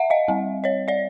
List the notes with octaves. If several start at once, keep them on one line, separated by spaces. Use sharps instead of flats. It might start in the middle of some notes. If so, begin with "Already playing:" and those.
Already playing: E5 F#5
D#5 F5
G3 C4
C#5 D#5
D5 E5